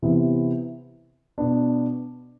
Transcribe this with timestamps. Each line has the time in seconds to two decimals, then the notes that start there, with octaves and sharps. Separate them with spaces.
0.02 C3 E3 B3 E4
1.38 B2 B3 D4